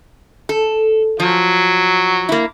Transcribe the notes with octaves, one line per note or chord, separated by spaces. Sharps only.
A4
F3 F#3
A#3 E4